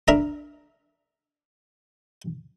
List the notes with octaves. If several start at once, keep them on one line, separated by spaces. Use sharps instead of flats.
D4 A#4 E5 A#5 B5